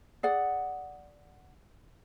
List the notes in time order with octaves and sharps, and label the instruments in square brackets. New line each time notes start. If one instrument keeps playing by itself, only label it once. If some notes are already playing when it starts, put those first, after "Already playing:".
[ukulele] G#4 D5 F#5